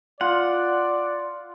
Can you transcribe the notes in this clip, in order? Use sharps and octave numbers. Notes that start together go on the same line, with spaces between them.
F4 D5 F#5